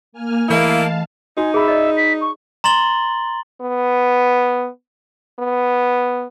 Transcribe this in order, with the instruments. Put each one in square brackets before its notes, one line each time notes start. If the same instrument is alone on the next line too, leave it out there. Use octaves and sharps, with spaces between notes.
[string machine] A#3 G#5 F6
[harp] E3 A3 D#5 [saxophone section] A#3 E4 [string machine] F5 A5
[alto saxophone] D#4 [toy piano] F#4 [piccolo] G#5
[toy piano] G#4 B5 [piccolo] E5
[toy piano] D5 D#5
[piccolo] B6
C#6
[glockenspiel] A#5 C6 A6 F#7 G7
[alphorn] B3
B3